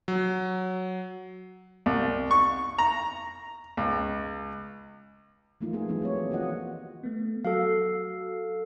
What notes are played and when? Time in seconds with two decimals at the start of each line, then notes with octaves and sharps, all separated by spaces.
0.08 F#3
1.86 C2
2.31 C#6
2.78 A#5
3.77 C#2
5.61 E3 F3 A3 A#3 D#4 F4
5.73 B3 D#4 G#4
5.88 E3 F#3 G3 A3 C4
6.02 C4 G4 C#5
6.30 D#3 A#3 F4 F#4 D#5 F#5
7.03 A3 B3
7.45 F#3 F#4 A4 F5